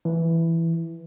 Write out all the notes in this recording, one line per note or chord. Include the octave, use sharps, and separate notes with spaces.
E3